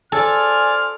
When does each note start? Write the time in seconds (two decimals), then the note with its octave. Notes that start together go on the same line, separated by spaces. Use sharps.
0.12 F4 A4 C5 D5 G#5 F6